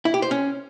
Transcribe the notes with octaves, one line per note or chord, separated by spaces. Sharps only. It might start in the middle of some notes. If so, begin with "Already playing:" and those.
E4
G4
C5
C#4